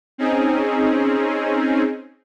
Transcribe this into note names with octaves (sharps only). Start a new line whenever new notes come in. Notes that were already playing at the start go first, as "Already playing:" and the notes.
C4 C#4 D#4 G#4